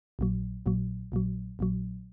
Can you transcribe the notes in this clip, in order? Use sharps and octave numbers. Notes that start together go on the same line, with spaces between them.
A#1 A#2 F#3
A#1 A#2 F#3
A#1 A#2 F#3
A#1 A#2 F#3